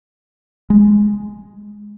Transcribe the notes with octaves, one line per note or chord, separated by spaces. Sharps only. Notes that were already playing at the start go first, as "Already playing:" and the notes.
G#3